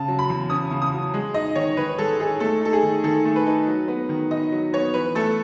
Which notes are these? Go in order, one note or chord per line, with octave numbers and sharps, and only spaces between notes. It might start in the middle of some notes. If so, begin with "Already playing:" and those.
Already playing: C#3 A5
F#3
B5
E2
C#4 D#6
C#3
D#6
F#3
G#3
D#4 D#5
D#3 C#5
D#3 B4
G#3 A4
D#4 G#4
A3 A4
D#4 A4
G#4
D#3
D#3 A4
A3
B4
D#4
F#3
B3
D#3
D#4 D#5
F#3
B3 C#5
E3 B4
A3 A4